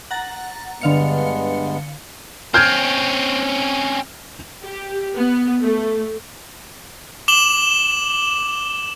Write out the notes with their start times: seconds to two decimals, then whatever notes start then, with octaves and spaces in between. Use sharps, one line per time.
0.11 F#5 A#5 A6
0.81 G2 D3 G#3 B3 F5 C#7
2.54 C4 C#4 F6 G6 G#6
4.62 G4
5.17 B3
5.62 A3
7.28 D6 E7 F#7 G7